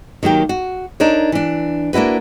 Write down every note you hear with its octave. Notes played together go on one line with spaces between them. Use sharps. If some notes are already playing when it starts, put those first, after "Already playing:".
D#3 F#3 A#3 G4
F#4
D4 D#4 A#4 C#5
E3 D4
A#3 D4 E4 F#4 B4